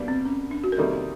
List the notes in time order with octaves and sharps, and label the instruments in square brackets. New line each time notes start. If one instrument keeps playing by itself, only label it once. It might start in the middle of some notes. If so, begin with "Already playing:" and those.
Already playing: [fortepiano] B2 G3 A#3 D4
[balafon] C4
C#4
D4
F#4
A#4
[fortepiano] C3 D#3 G3 A#3 [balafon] A4